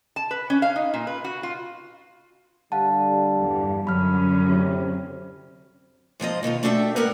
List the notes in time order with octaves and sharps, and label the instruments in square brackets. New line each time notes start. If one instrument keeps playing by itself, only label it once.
[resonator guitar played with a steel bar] A5
B4
C#4
F5
D#4
A#2
B4
F#4
F4
[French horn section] D3 G3 [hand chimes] F5 F#5 A5
[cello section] E2 G2
[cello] F#2 C#4 [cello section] D3 F#3 [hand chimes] B5 F6
[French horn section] A2 C3 C4
[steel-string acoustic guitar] G#2 F3 C4 D#5
B2 D#3 B3 F4
A3 D4 F#4 A4 E5 G5
G2 B3 A#4 E5 F#5